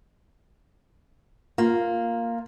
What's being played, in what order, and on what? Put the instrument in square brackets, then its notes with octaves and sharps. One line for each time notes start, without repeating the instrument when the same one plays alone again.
[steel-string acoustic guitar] A#3 [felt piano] F4